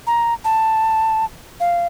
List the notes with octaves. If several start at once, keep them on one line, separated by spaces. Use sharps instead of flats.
A#5
A5
F5